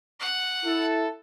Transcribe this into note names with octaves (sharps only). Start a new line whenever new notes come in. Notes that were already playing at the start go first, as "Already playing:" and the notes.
F#5
E4 A4